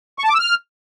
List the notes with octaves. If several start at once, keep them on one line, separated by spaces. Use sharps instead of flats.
C#6
A5
D6
E6
F6